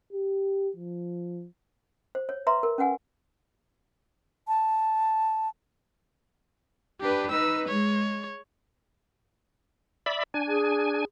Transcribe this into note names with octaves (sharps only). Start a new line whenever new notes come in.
G4
F3
C5
C#5
B4 E5 A#5 C6
A#4
C#4 B4 F#5 G#5
A5
D4 G4 B4
D#4 B4 E6
G#3 C#5
D5 E5 B5
D4 G#5
G#4